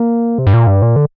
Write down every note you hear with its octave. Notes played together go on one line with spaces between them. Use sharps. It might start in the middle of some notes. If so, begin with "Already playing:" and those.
Already playing: A#3
C3
G2
A#2
G2
A#2
D3